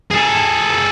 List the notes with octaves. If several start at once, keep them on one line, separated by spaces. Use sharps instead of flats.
G#4 A4